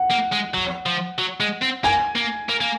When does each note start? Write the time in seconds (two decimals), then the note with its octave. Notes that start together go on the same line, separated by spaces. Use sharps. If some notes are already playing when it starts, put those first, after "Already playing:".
Already playing: F#5
0.10 A#3
0.32 G#3
0.54 F#3
0.86 F3
1.19 F#3
1.40 G#3
1.62 C4
1.84 A#3 G#5
2.16 A#3
2.49 A#3
2.61 A#3